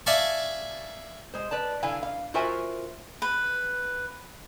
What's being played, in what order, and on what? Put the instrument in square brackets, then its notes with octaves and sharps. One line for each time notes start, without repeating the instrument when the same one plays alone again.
[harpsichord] D5 E5 F5 G#5 A5 C#6
[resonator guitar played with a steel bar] G#3 C5
B4 D5 A5
D3 E4 F5 G#5
F5
F4 F#4 A#4 C5 E5 G#5
[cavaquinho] B4